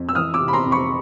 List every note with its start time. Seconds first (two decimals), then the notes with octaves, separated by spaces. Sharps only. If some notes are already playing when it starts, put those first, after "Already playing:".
Already playing: F2
0.09 E6
0.15 E3 D#6 F6
0.34 D6 E6
0.40 C3
0.48 B5
0.53 A#5 C6
0.66 F2
0.71 B5 C#6